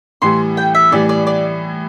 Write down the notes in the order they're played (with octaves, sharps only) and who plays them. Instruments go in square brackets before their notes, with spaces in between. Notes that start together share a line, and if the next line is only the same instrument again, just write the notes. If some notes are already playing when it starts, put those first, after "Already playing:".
[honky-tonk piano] A2 E3 G3 [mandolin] C6
[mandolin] G5
E5
[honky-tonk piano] A2 E3 G3 [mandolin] D5
[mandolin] D5
D5